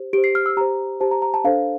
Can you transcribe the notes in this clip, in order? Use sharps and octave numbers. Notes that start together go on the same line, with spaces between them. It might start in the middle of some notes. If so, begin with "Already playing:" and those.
Already playing: G4 C5
G4 C5 D7
C7
F6
E6
G4 C5 A#5
G4 C5 A5
A#5
A#5
A5
D4 A4 C5 F5